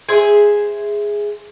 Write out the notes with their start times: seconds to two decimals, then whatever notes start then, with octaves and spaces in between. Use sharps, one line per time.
0.09 G#4 C5 E5